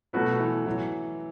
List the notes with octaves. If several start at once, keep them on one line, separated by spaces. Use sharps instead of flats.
B2 F#3 A3 F#4 B4
E3
E3 F#3